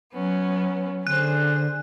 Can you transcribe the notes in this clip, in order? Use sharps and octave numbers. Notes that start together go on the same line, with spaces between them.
F#3 B3 C#4
D3 G#4 C5 F#6